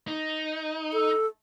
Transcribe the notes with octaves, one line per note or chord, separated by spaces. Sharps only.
D#4
A4